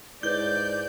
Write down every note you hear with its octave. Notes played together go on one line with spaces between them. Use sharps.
G#2 E4 B4 C#5 D5 G6